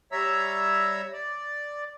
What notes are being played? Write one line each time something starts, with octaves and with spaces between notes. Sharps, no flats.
G3 C#5 E5 A#5 E6
D5